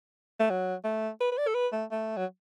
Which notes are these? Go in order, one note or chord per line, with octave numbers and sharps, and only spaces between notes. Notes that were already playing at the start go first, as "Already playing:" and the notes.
A3
F#3
A3
B4
B4
D5
A4
B4
A3
A3
F#3